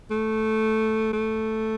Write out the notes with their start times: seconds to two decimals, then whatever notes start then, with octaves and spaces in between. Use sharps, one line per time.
0.11 A3
1.13 A3